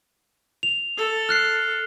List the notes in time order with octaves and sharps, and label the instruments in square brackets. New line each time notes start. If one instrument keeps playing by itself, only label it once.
[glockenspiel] F7
[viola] A4
[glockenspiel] F6 F#6 C7